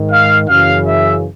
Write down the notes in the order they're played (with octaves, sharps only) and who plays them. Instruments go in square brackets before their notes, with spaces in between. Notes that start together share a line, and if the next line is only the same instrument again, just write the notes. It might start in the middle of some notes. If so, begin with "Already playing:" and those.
Already playing: [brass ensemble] G#2 D#3
F5
F#2 C#3 E3 F5
E5